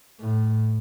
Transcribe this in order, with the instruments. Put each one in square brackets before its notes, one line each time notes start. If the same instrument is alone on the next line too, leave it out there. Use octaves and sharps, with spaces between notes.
[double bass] A2